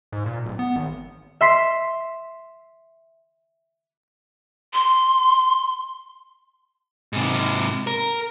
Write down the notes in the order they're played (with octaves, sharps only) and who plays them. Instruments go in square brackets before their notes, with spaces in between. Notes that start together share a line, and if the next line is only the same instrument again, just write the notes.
[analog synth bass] G#2
A#2
D1
B3
G#1
[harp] E5 C6 B6 C7
[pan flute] C6
[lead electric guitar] G#2 C3
A#4